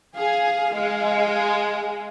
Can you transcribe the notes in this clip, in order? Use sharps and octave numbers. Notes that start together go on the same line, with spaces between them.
G#4 F5
G#3